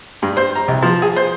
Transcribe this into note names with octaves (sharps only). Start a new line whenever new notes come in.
G2
C5
A#5
C2
F3
G#4
C5